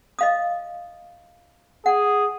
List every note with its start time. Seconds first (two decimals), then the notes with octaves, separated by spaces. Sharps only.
0.19 D#5 F5 D#6
1.86 G#4 F#5